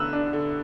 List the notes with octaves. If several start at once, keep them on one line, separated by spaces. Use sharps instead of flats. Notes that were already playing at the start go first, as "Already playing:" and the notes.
Already playing: D3 A3 B3 E6 F#6
D4
D3